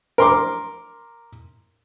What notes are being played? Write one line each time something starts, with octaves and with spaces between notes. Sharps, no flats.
A#4 C6 D6